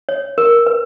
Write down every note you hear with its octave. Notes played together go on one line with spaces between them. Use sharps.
C#5
A#4
B4